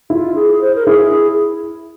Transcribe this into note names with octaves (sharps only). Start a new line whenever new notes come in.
E4 F4
G#4
C5
A#4
E4 G#4